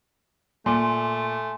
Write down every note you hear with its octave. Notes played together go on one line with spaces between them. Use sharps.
A#2 A3 G#5 C6